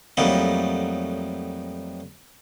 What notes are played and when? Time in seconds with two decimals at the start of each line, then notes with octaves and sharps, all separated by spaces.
0.17 F2 A2 F#3 G3 A#3 D#4